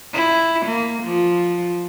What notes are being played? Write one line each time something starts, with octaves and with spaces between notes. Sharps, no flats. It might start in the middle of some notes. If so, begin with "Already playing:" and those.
E4
A#3
F3